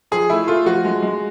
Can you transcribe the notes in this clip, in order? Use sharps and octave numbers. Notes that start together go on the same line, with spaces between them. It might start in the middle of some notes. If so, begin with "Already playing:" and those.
F3 G#4
A3 E4
A3 F4
F3 F#4
G#3
G#3